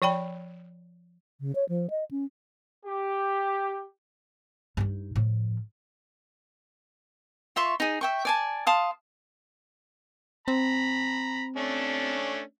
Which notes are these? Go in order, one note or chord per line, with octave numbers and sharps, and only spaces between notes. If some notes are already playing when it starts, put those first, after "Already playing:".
F3 D5 G5 B5
C#3
C#5
F3
D#5
C#4
G4
G2 D#4
A2 F3
F4 E5 C6 C#6
D#4 G#4
E5 G5 C#6
D5 G#5 A5
F5 A5 C6 D#6
C4 A#5 B5
A3 C#4 D4